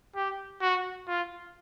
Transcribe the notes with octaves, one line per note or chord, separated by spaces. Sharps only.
G4
F#4
F4